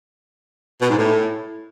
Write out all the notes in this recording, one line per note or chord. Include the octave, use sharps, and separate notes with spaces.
B2
G#2
A2